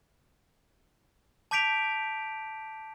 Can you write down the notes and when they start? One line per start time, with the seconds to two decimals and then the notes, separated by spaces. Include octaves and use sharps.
1.51 A5 D6 G6 B6 D7 F7